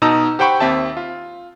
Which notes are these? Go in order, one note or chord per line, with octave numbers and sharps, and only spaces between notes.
B2 D#4 A5 A#5 D#6 E6
G4 C5 F#5 G5 B5 C#6
D#2 C4 E5 A5
F4